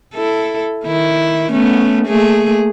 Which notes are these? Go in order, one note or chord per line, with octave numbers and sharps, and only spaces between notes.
E4 A4
D#3 E4
A3 B3 C#4
A3 A#3 G#4